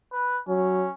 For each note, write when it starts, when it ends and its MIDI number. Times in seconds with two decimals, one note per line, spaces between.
0.12 0.38 71
0.48 0.86 54
0.48 0.93 61